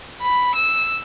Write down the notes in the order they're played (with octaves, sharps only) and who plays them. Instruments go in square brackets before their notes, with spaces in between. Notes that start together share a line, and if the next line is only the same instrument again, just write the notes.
[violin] B5
E6